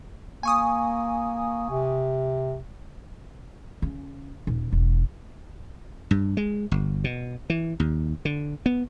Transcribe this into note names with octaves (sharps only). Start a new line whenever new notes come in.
A#3 G#5 C#6 D#6
C3
C#3
D#1
E1
G2
G#3
G1
B2
E3
D#2
D3
B3